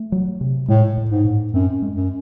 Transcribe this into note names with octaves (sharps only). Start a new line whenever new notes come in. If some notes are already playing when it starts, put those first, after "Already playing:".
Already playing: A3
F#3
C3
A2 G#3
A2
G#2
A2
F#2 C4
G#3
F#2